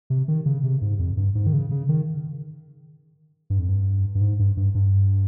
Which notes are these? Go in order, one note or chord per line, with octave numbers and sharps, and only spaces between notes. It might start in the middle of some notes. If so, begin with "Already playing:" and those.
C3
D#3
C#3
C3
G#2
F2
G2
G#2
D#3
C#3
C#3
D#3
G2
F2
G2
G2
G#2
G2
G2
G2